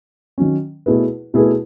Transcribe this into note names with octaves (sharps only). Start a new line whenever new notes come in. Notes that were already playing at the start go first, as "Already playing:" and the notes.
D#3 F#3 C#4
B2 A3 E4 G#4 B4
B2 A3 E4 G#4 B4